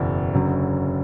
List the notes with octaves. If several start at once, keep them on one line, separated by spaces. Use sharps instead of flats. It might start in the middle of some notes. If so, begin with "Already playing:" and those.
Already playing: F#1 E2 B2
F#1 F#2 D3 F#3